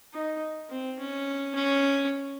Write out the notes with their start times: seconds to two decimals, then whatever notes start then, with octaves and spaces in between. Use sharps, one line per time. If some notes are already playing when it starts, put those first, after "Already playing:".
0.13 D#4
0.69 C4
0.99 C#4
1.55 C#4